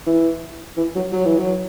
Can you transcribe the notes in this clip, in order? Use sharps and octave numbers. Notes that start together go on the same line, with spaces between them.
E3
E3
F#3
F#3
E3
F#3